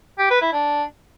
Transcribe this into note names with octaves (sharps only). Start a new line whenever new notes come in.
G4
B4
E4
D4